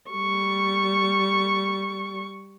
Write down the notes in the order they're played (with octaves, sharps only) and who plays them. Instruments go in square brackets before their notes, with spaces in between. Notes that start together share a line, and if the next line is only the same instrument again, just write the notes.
[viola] G3 C#6